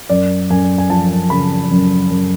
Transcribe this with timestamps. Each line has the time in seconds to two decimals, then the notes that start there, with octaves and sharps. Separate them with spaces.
0.09 F#2 D5
0.50 F#2 G#5
0.78 G#5
0.90 F3 A5
1.30 C#3 B5
1.71 F#2
2.10 F#2